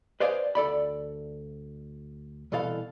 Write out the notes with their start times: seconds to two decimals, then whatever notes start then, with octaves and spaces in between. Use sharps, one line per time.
0.20 B4 C5 D5 D#5 F5 G#5
0.55 D2 A4 D5 B5
2.52 C2 B2 E3 A4 F5